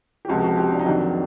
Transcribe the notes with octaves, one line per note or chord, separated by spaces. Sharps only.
G4
C#2 C3 F3 F#4
F#4
G4
D4
D#4
F2 C3 D#3 F#3 D4